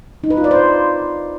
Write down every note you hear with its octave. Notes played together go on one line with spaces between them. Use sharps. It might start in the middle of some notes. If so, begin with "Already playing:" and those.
D#4
B4
F4
D5
C5